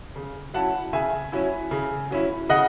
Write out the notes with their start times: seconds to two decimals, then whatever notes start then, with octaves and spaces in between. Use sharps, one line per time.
0.16 C#3
0.54 F#3 C#4 E4 F#5 A5
0.93 C#3 E5 G#5
1.32 F#3 C#4 E4
1.71 C#3
2.11 F#3 C#4 E4
2.49 C#3 D#5 F#5